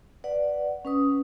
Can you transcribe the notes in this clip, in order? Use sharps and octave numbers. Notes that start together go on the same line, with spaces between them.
B4 D5 F#5
C#4 B4 D#6